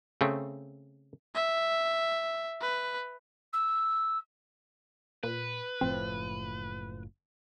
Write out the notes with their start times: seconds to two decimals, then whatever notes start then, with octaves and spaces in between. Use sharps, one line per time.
0.21 C#3 A3 C4
1.35 E5
2.62 B4
3.53 E6
5.23 A#2 B4
5.81 F#1 A2 F3 C4